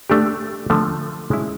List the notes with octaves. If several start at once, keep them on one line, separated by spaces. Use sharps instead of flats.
A3 D4 G4
D3 F3 A3
G#3 C#4 E4